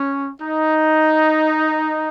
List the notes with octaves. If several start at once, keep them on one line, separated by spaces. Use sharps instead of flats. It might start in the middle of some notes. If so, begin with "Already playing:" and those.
Already playing: C#4
D#4